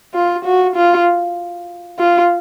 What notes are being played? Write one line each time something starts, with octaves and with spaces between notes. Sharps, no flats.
F4
F#4
F4
F4